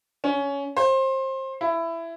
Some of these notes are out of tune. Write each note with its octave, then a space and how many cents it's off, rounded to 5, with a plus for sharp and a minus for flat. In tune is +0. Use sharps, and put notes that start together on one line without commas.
C#4 +15
C5 +25
E4 +15